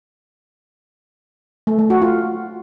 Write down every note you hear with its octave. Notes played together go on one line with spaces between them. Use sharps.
A3
A3
F#4
F4